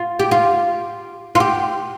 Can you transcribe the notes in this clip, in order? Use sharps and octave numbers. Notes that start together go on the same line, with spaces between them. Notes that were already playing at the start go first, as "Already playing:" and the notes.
Already playing: F4
G4
F4
F4
G4